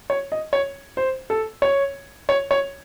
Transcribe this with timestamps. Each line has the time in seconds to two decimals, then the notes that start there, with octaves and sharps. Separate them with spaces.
0.10 C#5
0.32 D#5
0.53 C#5
0.97 C5
1.30 A4
1.62 C#5
2.29 C#5
2.51 C#5